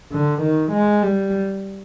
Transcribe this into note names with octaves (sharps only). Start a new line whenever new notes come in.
D3
D#3
G#3
G3